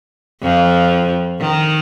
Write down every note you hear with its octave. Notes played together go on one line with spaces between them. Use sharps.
F2 F3
D#3